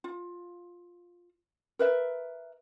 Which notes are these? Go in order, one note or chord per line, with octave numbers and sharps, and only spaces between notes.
F4
A#4 B4 E5